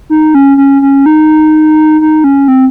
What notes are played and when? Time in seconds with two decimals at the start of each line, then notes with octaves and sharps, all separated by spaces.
0.10 D#4
0.35 C#4
0.57 C#4
0.82 C#4
1.06 D#4
2.01 D#4
2.24 C#4
2.48 C4